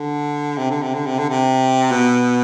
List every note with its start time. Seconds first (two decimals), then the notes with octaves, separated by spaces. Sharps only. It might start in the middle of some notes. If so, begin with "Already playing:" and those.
Already playing: D3
0.58 C3
0.71 D3
0.82 C3
0.94 D3
1.06 C3
1.18 D3
1.30 C3
1.91 B2